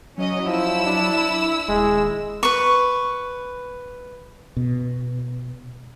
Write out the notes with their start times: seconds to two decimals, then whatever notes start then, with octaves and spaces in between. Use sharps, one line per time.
0.18 F#3 C#4 D#5
0.47 F3 E4 E6
0.85 D4
1.68 D#1 G#3
2.43 B4 C#6
4.57 B2